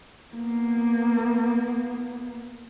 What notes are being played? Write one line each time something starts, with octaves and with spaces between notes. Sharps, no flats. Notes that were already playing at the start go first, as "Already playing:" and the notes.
A#3 B3